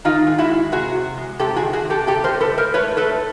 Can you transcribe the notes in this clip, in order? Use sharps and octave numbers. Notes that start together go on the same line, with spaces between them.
D#3 D#4 F4
G#3
E4 F#4
G#3
C3 F#4 G#4
C3
G#3
C3 G4 A4
F#4 G#4
D#3
F#4 G#4
C3
G4 A4
C3 G4 A4
A#4 C5
C3
A4 B4
G#3
A#4 C5
A3 B4 C#5
A3 A4 B4